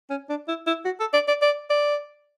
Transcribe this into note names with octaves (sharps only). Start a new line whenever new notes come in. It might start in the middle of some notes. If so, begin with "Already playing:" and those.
C#4
D4
E4
E4
F#4
A4
D5
D5
D5
D5